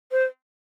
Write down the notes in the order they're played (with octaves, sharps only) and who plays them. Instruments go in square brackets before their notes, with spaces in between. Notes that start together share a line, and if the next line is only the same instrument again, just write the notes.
[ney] C5